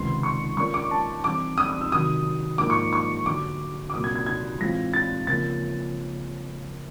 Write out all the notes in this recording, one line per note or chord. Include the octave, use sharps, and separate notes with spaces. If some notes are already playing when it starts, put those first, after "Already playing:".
Already playing: C#2 C3 D#3 G#3 B3 C6
C#6
G#3 C#4 F4 A#4 D5 C#6
D6
A5
E3 G3 C4 D6
D#6
D#6
E6
C3 D#3 F#3 D#6
G#2 F3 A#3 D#4 D6
C#6
C#6
D3 F#3 B3 D6
D6
C2 A#2 F#3 A#3 D#6
G#6
G#6
G#6
A2 E3 G#3 C4 F4 A#6
A6
C#3 F3 A#3 C#4 A6